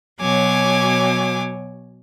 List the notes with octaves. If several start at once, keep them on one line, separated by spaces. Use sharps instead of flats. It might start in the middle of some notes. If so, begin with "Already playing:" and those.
B2 F#3 C#5 G#5 D6